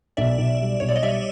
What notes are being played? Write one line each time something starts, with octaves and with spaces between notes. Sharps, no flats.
B1 D5 E5
B1
G3
B1 C#5
D5
D#5
G3 D5 E5